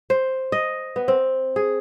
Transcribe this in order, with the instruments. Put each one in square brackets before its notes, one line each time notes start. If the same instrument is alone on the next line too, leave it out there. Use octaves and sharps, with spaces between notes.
[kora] C5
D#5
B3
C4
G#4